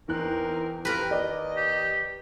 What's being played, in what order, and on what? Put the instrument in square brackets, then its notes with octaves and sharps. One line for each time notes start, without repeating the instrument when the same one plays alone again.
[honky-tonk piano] E2 F#6 [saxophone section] C4 D#4 A#4
[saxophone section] F3 C4 G4 [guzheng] A#4 B4
[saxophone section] D#2 D#5 [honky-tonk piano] D5
[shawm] G4